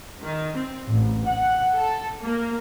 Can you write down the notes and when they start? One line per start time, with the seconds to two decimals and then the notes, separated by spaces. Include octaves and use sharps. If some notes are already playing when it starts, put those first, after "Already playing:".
0.24 D#3
0.56 C4
0.88 A1
1.27 F#5
1.76 A4
2.22 A#3